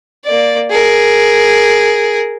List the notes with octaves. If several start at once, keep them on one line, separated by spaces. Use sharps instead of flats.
A#3 D5
G#4 A#4